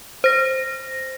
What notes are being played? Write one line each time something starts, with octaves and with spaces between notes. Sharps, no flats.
C5 A#6